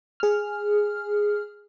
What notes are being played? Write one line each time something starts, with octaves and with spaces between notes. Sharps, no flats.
G#4 F6